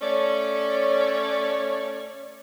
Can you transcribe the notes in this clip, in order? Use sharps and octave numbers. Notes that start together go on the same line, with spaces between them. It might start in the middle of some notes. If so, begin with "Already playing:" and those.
A3 C#4 C#5 D5